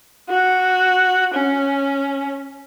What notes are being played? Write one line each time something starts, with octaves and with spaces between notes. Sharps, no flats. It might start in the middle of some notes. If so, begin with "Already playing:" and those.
F#4
C#4